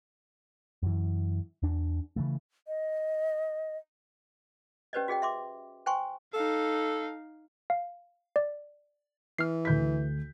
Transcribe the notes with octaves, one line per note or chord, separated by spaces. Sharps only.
F#2 E3
E2 D4
C#3 E3 A3
D#5
C#4 G4 B4 C5 D5 D#5
F#4 G#4 D#5 G5
E5 C6 D6
C5 G5 G#5 C6 C#6
D#4 A4 F5
F5
D5
E3 F6 C7
D2 G6 B6